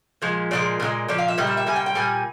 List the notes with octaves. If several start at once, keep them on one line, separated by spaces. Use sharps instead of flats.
A#2 F3 G#3
A#2 F3 G#3 D5
A#2 F3 G#3
A#2 F3 D5
F5
E5
A#2 G3 D#5
E5
E5
A#2 G3 G#5
G5
G5
A#2 G3 G#5